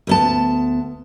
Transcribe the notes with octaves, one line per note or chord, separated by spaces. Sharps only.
D2 B3 A5